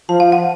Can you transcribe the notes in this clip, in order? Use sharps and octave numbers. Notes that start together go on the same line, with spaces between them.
F3 A5
F5
F#5